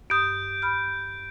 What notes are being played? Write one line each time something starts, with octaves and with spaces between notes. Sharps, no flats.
G2 D#6 G6 D7
B5 F6